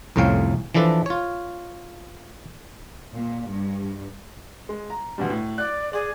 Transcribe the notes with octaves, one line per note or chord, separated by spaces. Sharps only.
C2 F2 A2 C#4 F5 G5
E3 F3 D4 A4 B4
F4 C#5
A#2
G2
G#3
A#5
D2 B2 G3
A2
D5 F#6
G#4 D5